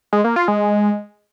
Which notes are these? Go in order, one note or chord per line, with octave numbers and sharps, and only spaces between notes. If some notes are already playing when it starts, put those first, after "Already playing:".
G#3
A#3
F4
G#3